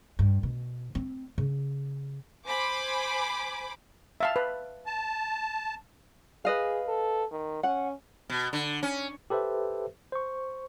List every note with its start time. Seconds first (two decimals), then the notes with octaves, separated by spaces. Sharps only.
0.19 G2
0.43 B2
0.95 C4
1.38 C#3
2.46 C5 G#5 B5 D6
4.20 E5 F5 A5
4.36 B4
4.86 A5
6.45 G#4 B4 D#5 F5
6.88 A4
7.32 D#3
7.63 C#4 F#5
8.30 B2
8.53 D3
8.83 C#4
9.30 G4 A4 B4 C5 E5
10.12 C5 C#6